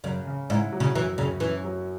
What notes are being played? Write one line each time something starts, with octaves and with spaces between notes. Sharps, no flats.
F#2 C#3
C#3
G#2 E4
F#3
C#3
F#2 E3
F#2 C#3
E3 C#4
F#3